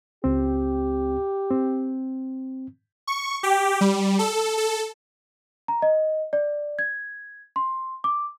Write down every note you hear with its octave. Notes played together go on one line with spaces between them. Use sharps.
C#2 C4 G4
C4
C#6
G4
G3
A4
A4
A#5
D#5
D5
G#6
C6
D6